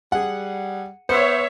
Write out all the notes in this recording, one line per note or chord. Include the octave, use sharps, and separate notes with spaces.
G3 G#4 F#5
B3 C5 C#5 E5